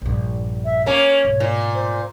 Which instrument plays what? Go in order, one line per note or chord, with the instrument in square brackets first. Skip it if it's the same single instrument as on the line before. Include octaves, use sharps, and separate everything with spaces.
[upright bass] A#1 G2
[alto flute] E5
[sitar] A#3 C#4 [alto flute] C#5
[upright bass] G#2 B2
[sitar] A#2
[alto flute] C5